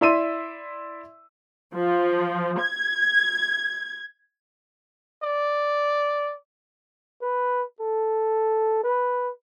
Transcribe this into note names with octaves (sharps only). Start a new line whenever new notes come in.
E4 D5 E5 C6 E6 D#7
F3
G#6
D5
B4
A4
B4